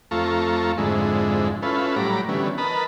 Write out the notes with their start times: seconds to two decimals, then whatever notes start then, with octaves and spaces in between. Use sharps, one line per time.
0.11 F2 A3 F4 A4 A#5 C#6
0.78 F2 G#2 D3 G#3 E4
1.62 C#4 E4 F4 A4 B4
1.96 A2 F#3 G3 A#5 B5 D6
2.29 D3 E3 G3 B3 C#4
2.58 A#4 B4 D#5 A5 B5